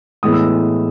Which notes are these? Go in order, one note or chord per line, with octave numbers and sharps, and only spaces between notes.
A2 E3 G#3 B3 D#6
E6